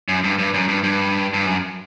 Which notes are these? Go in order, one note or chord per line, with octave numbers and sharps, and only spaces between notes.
F#2
G2
G2
F#2
G2
G2
G2
F#2